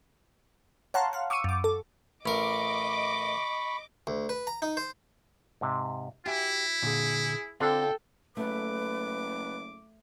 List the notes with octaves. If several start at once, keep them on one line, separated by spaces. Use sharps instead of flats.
C#5 F5 F#5 A5 A#5 C6
F5 F#5
C#6 D6 E6 C#7 D#7
F#2 D6
A4
A1 A#4 D#5 B5 C#6 D6
D2
B4
A#5
D#4
C5
G#2 C3
E4 F#4 G4 E5 G#5
A#2 D3 G#4
D3 C4 D4 F4 A4 G5
F#1 A3 B4 D6